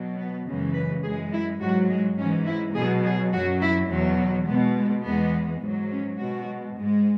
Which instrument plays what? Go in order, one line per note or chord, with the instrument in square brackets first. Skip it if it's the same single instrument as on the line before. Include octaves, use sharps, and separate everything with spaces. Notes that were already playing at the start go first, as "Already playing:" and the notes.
Already playing: [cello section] B2 F#3
B3
F#2 C#3 E3 G#3
B4
F#2 E3 G#3 G#4
E4
G#2 F#3 F#4
G#3
G#2 E3 G#3 C#4
E4
B2 F#3 G#4
G#4
F#2 F#3 F#4
E4
E2 B2 F#3
B2 G#3 B3
G#3
E2 E3 G#3 B3
G#2 F#3
C#4
B2 G#3 F#4
G#2 G#3